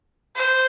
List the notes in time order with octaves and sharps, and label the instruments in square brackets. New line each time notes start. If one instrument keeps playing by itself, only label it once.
[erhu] C5